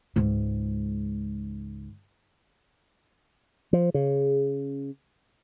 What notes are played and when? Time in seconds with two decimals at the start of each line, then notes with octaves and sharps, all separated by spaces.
0.16 C#2 G#2
3.73 F3
3.94 C#3